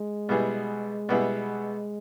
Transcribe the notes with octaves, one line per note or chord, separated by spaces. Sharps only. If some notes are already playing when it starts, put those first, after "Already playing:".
Already playing: G#3
B2 G3 B3 E4 G#4
B2 G3 B3 E4 G#4